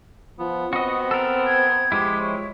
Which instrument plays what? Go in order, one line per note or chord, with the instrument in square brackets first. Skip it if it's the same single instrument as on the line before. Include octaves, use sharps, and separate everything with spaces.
[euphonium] F3 [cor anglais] B3
[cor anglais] B3 [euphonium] C4 [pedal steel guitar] F#4 D#5
[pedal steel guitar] A4 A#4
[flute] G#6
[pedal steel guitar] F3 G#3 E4 [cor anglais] G4
[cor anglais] C#5